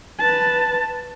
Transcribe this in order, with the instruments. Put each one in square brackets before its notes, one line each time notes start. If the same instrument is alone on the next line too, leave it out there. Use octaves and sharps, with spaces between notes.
[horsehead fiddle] B4 A5